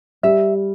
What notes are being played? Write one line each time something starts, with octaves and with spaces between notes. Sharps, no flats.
G3 E5